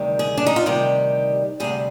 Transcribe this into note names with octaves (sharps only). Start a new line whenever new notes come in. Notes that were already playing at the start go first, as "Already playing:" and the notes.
Already playing: D2 C3 D#3 G3
G#4
D4
D#4
F4
D2 C3 D#3 G3 G4
D2 C3 G3 G#4